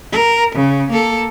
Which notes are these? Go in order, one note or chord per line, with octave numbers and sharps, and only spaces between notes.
A#4
C#3
A#3 A4